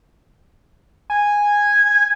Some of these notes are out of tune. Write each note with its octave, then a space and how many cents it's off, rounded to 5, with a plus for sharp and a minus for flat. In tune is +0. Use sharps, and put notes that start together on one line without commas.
G#5 -10